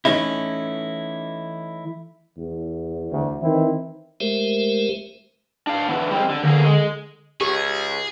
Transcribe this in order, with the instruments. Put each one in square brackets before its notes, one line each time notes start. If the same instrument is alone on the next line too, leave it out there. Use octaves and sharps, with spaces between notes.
[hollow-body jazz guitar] E3 A3 C#4 D#4 E4
[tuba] E2
[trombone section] D2
[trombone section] D#3 C4 E4 [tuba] E3
[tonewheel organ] G#3 A3 G4 A#4 C5 E5
[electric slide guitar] D4 F5
D3 E3 B3
G3 G#3 C4
D3
[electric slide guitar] E2 A#3 G#4 [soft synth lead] D3
[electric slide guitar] G#3
[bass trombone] C#2 [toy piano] G4 [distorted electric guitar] G#4